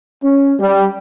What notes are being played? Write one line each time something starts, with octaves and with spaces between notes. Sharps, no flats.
C#4
G3